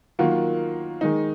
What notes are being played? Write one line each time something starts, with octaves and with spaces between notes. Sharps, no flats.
D#3 F#3 A#3 F4
D#3 G#3 D#4